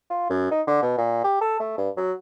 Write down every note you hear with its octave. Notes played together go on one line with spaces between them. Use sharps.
F4
F#2
D#4
D3
B2
A#2
G4
A4
A3
G2
F#3